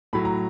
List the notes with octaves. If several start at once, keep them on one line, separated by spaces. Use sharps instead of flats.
A2 F#3 B5
A#5